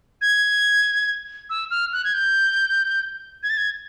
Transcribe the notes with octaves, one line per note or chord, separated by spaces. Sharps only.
G#6
E6
F6
F#6
G#6
G6
G#6
A6
G#6